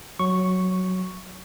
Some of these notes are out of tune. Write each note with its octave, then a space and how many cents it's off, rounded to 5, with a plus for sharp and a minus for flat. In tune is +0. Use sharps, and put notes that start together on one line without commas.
F#3 +0 C#6 +0